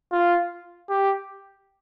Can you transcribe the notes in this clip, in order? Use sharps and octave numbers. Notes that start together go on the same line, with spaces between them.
F4
G4